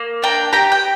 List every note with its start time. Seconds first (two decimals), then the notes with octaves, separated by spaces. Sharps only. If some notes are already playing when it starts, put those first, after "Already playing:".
Already playing: A#3
0.22 D4 G5 A#5
0.53 G4 G5 A#5
0.72 G5